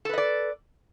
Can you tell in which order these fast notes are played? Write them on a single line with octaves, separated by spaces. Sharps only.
A4 B4 D#5 D5